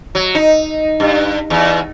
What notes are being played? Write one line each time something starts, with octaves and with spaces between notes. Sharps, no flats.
F#3
D#4
G2
E2